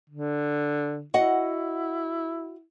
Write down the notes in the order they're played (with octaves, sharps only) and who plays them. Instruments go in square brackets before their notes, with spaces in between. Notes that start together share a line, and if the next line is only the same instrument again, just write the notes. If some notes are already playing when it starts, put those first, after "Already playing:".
[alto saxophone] D3
[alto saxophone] E4 [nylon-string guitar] F#4 D#5 F#5